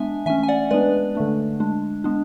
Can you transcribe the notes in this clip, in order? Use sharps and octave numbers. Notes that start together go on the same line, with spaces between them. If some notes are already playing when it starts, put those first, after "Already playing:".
Already playing: G#3 B3 D4 E5 G#5
E3 A3 C#4 E5 G#5
G#5
D5 F#5
G#3 B3 D4 B4 D5
D3 A3 D4
G#3 D4
G#3 B3 D4